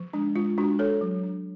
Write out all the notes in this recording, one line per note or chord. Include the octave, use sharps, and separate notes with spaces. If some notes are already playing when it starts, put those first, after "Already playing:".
Already playing: F3
G#3 D4
G#3 F4
G#3 D4 F#4
D4 A4 C#5
F#3
D4